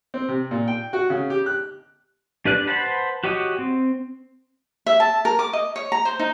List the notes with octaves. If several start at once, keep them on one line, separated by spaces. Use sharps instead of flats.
C4
C3
A#2
G5
F#4
C#3
G4
F#6
D4 G4 B4 D5 F#6
B4 C5 F#5 A5 B5
F#4 G4 C#5 D#5
C4
E5
A5
A#4
D6
D#5
C#5
A#5
C5
D#4